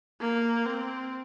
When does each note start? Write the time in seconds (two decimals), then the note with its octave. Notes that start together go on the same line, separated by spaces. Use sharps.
0.21 A#3
0.66 C4